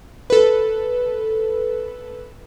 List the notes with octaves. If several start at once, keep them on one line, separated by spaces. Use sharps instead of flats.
A4 B4